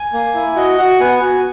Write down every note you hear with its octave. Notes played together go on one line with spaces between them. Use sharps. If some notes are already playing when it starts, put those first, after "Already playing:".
Already playing: G#5
A#3
E4
F#4 D#5
F#4 F#5
B3 G#5
F#5
F#4 G#5